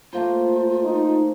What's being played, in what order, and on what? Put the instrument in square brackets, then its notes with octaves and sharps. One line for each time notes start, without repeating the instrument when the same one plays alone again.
[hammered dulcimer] A3 A#3 C5 [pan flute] F4
[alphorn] D#4